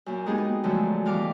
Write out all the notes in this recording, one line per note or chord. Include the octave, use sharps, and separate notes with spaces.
F#2 A#2
G#3 A#3 B3 D#4 G4 G#4
B3
F#2 D3 F3 F#3 G#3 A3
B2 E3 G3 F4 F5 D6